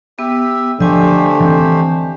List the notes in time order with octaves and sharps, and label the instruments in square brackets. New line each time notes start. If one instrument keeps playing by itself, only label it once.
[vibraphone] B3 [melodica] G4 E5
[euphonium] D3 [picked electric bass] F3 [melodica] A3 G4 C5 [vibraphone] D#5 G#5
[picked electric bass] E3 C4